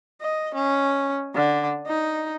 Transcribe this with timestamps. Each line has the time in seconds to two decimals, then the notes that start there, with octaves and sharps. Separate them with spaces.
0.21 D#5
0.54 C#4
1.35 D3
1.87 D#4